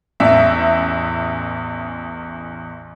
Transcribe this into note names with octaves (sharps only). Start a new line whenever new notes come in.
A1 E2 E5